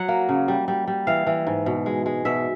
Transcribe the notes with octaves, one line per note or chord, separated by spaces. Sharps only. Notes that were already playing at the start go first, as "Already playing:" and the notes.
Already playing: F#3 F#5
A#3
C#3
G3
G3
G3
E3 F5
E3
G#2
B2
G#3
G#3
B2 E5